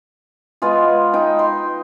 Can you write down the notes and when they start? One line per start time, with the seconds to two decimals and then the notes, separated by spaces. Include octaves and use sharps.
0.62 G#3 B3 F4 G#4
1.14 D#4 G5
1.39 C6